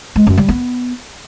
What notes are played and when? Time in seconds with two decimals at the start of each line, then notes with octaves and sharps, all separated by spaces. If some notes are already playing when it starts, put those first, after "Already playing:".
0.16 G#3
0.27 F#2
0.38 G3
0.48 B3